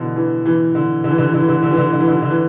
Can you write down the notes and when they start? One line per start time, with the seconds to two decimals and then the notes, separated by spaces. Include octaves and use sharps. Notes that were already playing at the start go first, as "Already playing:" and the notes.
Already playing: B2 D3 E3
0.16 E3
0.46 E3
0.75 D3
1.04 D3
1.11 E3
1.18 D3
1.26 E3
1.34 D3
1.40 E3
1.48 D3
1.55 E3
1.63 D3
1.71 E3
1.77 D3
1.86 E3
1.92 D3
2.00 E3
2.08 D3
2.14 E3
2.22 D3
2.30 E3